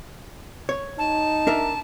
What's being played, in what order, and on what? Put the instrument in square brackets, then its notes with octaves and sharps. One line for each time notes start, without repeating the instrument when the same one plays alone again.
[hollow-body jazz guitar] C#5
[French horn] D#4 [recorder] A5
[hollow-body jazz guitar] D4 A#4 E5